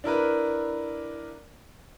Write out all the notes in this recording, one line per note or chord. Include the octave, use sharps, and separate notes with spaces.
D4 E4 A#4 B4